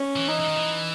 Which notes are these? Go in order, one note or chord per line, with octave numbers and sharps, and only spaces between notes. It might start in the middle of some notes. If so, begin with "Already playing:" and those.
Already playing: C#4
E3
D#4
E3
D#3
E3